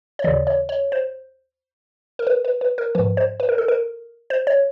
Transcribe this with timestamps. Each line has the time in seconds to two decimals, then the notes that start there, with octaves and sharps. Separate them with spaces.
0.19 C#5
0.24 D#2 C#3 E3 D5
0.47 C#5
0.69 C#5
0.92 C5
2.19 A#4
2.27 B4
2.45 B4
2.61 B4
2.78 A#4
2.95 G#2 F3 B4
3.17 C5
3.40 B4
3.49 A#4
3.58 A4
3.68 A#4
4.30 C5
4.47 C#5